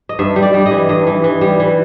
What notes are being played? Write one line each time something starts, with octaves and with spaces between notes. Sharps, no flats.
D#5
G2 E5
G3
D5
G3
D#5
E3
G2 D#5
E3
E3
G3
E3